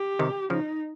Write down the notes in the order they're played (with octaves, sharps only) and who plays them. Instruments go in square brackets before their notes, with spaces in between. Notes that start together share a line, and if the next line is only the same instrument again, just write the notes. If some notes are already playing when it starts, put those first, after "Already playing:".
Already playing: [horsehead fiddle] G4
[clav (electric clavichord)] C3 D#3
[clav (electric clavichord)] C#3 F3 [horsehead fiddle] D#4